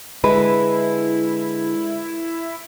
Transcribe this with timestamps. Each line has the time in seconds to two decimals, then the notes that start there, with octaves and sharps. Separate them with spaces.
0.24 D3 G#3 E4 B4